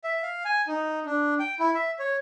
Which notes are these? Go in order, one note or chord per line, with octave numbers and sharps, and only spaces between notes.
E5
F5
G#5
D#4
D4
G5
E4
E5
C#5